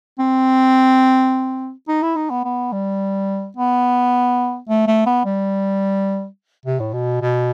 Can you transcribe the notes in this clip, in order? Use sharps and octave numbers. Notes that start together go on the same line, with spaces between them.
C4
D#4
E4
D#4
B3
B3
G3
B3
A3
A3
B3
G3
C3
A2
B2
B2